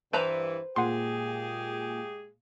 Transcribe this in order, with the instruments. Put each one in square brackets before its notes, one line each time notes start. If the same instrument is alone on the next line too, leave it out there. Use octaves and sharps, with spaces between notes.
[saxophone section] G2 E3 [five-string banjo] B4 C5 A#5
[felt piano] A#2 [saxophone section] G#3 G4 G#4 [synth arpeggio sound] F#5 C6